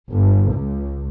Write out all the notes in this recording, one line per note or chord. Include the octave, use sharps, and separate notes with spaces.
G1
C#2